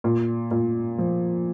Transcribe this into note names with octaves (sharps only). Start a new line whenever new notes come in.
A#2
A#2
F3